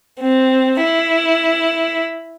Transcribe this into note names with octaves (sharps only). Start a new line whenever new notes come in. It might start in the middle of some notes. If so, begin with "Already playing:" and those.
C4
E4